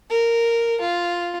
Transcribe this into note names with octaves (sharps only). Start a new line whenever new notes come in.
A#4
F4